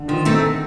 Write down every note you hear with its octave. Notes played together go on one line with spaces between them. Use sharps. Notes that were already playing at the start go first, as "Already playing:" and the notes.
Already playing: D3
D#3 F3
A3 C4 D#4 G#4